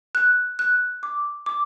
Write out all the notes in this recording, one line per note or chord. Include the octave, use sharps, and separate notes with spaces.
F#6
F#6
D6
D6